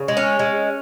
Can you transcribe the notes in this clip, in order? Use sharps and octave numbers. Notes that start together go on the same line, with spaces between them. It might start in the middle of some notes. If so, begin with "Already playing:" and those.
Already playing: C#3
G#3
C#4
G#3